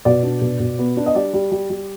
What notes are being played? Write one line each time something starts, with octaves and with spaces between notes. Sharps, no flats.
B2 D5
D4
B2
B2
B3
D4
D#5
G3 D5
G3
G3
G3